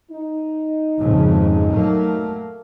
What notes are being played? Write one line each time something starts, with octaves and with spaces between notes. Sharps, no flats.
D#4
G#1 F2 C#3
F#3 A3 A#3